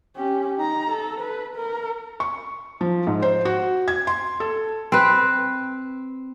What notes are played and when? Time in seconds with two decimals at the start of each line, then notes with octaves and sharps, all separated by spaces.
0.16 C#4 G4
0.57 D#4 A#5
0.90 A4
1.20 B4
1.56 A#4
2.20 C#6
2.81 F3
3.07 G#2
3.22 C5
3.45 F#4
3.88 G#6
4.07 C6
4.40 A4
4.92 C4 B4